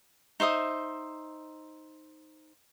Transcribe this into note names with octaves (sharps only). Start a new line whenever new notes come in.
D#4 C5 E5 D#6